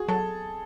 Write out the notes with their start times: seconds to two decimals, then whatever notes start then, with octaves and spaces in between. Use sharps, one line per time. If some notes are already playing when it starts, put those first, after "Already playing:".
Already playing: F#4 G#4
0.08 F#3 A4